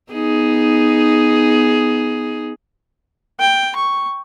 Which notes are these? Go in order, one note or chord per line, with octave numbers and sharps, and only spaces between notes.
B3 D#4 G#4
G5
C#6